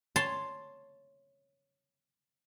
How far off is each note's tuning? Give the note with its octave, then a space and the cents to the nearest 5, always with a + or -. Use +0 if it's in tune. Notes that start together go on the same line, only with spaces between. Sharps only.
C#5 +0 A5 +0 C6 +0